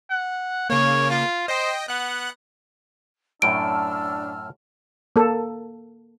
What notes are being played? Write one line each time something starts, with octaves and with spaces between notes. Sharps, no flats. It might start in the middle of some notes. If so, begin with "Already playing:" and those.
F#5
C#3 A#3 C#5
F4
C5 D#5 G5
B3 F#5 F#6
F#2 A2 D4 G5 A5 E6 F6 D7
A#3 A4